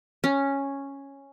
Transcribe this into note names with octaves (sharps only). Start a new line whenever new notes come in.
C#4